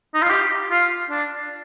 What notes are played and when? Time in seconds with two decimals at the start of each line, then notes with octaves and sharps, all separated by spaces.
0.14 D#4
0.22 F4
0.30 G4
0.71 F4
1.10 D4